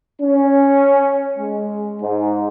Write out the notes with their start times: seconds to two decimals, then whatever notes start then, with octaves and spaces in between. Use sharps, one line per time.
0.22 C#4
1.38 G#3
2.02 G#2